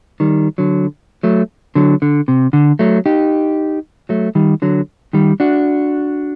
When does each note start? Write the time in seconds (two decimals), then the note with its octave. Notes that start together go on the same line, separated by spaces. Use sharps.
0.20 D#3 G3
0.58 D3 F#3
1.23 F#3 A3
1.75 D3 F#3
2.02 D3
2.28 C3
2.53 D3
2.79 F#3 A3
3.06 D#4 G4
4.09 F#3 A3
4.35 D#3 G3
4.62 D3 F#3
5.13 D#3 G3
5.40 D4 F#4